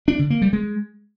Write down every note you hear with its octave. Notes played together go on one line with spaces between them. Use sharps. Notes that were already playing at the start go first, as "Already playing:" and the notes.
D4
D3
A#3
G3
G#3